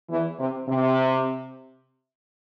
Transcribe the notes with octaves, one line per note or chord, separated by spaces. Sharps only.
E2 E3
C3
C3